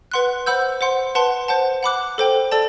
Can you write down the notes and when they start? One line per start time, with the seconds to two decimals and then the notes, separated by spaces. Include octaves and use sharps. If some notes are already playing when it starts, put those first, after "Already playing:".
0.12 B4 F#5 C6 F#6
0.46 C5 F#5 B5 E6 G6
0.81 C5 F#5 C6
1.15 B4 F#5 A5 C6
1.48 C5 F#5 A5
1.83 F#5 B5 D6 F#6
2.18 A4 C5 G5
2.51 A4 D5 A5